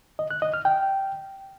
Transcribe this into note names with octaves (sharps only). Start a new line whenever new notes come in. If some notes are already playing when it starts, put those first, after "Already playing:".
D#5
F#6
D#5
F6
G5